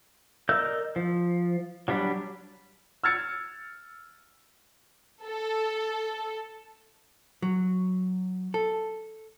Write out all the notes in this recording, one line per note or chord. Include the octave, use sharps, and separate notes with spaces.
A#4 D5 D#5 E6 G6
F3
F#3 G3 D4 B5
E6 F6 G#6 A6 C#7
A4
F#3
A4